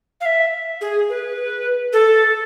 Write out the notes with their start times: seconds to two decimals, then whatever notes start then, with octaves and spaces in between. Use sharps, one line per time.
0.21 F5
0.26 E5
0.81 G#4
1.10 B4
1.93 A4